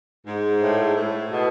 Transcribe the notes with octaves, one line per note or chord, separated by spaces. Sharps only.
G#2
A2
A2
B2